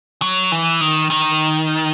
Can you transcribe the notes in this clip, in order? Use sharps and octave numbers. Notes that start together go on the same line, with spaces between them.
F#3
E3
D#3
D#3